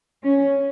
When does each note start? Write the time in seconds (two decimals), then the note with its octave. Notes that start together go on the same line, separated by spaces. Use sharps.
0.24 C#4